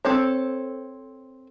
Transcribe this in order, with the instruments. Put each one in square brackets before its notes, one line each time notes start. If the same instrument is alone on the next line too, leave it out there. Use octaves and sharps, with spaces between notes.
[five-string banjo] C4 A4 C#5